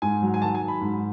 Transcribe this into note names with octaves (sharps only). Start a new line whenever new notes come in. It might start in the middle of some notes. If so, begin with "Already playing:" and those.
G#2 G#5
F#3
G#5
D#3 A5
G#5
F#3
B5
G#2